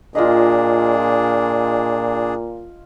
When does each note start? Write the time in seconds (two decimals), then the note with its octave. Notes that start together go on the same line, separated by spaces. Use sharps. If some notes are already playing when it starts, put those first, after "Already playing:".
0.15 A#2 D4 F4 G#4 D#5